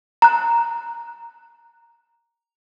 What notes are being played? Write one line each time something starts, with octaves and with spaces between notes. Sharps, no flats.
A#5 F#6